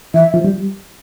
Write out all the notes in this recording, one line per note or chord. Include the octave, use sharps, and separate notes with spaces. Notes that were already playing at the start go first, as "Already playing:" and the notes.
E3 E5
F3
G3